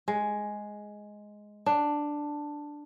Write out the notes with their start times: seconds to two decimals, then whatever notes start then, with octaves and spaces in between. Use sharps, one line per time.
0.08 G#3
1.66 D4